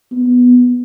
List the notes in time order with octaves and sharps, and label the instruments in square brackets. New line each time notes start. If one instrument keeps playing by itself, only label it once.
[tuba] B3